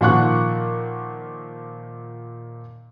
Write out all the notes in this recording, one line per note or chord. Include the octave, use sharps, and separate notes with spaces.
A#2 D#3 F3 F#5 C#6 F#6